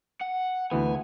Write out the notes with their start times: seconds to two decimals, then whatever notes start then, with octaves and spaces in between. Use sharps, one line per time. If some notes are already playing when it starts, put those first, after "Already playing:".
0.21 F#5
0.71 D2 E3 B3 G#5